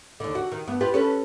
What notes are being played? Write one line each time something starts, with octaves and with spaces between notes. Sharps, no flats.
D#2 D3
F#4
D#3
G2 B3
F4 G4 B4
C#4 A4 B4